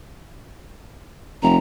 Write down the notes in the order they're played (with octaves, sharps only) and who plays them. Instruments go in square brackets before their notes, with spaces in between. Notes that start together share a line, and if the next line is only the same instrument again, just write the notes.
[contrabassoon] F1 [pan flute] A#5